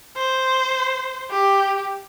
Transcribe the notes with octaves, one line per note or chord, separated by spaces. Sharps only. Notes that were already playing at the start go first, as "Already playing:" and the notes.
C5
G4